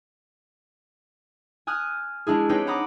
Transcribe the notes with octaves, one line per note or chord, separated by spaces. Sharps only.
G#5 D#6 F6 F#6
G#3 D4 E4 G#4
C4 D#4 G4 B4 C#5
F#5 A#5 B5 D6 D#6